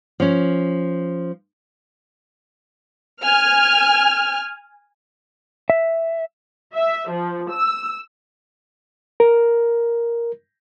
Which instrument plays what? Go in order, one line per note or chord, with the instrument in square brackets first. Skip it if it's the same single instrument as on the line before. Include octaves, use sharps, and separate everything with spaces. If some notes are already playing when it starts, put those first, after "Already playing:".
[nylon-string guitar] F3 C#4
[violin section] G#5 F6
[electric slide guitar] E5
[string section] E5
F3
E6
[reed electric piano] A#4